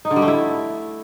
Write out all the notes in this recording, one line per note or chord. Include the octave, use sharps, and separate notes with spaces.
D#4
D3
G3
A3
E4